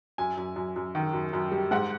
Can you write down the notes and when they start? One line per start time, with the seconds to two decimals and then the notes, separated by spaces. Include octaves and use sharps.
0.18 F#2 G#5
0.37 F#2
0.56 F#2
0.76 F#2
0.95 D#3
1.13 F#2
1.33 F#2
1.52 G3
1.71 G#2 F#5